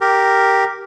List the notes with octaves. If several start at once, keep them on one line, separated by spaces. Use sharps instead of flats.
G4 A#4